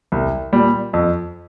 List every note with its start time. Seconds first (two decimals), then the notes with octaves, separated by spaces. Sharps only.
0.12 C2
0.53 A#2 G3
0.93 F2